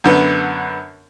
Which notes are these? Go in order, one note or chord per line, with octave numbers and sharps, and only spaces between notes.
F#2 D3 B3